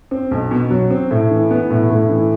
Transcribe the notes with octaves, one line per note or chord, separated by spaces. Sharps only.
C4
B1
B2
F#3
C4
A2
E3
B3
A2
A2
E3